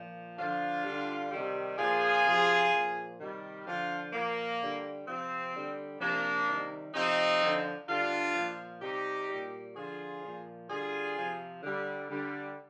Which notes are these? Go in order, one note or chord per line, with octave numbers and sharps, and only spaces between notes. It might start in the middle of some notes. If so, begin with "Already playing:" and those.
Already playing: A#2 F3
D3 F3 D4 F4
D3 G3
C3 D#3 G3
A#2 F3 F4 G#4
C3 F3
A#2
F3
C3 D#3 G3
D3 F3 D4 F4
A#2 F3 A#3
D3 G3
C3 F3 C4
D3 G3
C3 F3 A#3 D4
C3 D#3 G3
C3 F3 C4 D#4
D3 F3
D3 G3 D4 F4
A#2 F3
C3 G3 D#4 G4
A#2 G3
D3 F3 F4 G#4
A#2 F3
D3 G3 F4 G#4
C3 F3
D3 G3
D3 G3